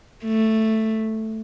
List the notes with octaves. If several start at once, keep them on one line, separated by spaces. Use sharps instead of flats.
A3